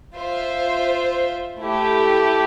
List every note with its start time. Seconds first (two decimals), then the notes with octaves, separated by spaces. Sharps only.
0.16 F4 C5 E5
1.61 A3 E4 G4